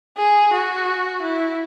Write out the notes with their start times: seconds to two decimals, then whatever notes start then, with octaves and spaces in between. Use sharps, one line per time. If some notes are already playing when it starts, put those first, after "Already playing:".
0.17 G#4
0.53 F#4
1.22 E4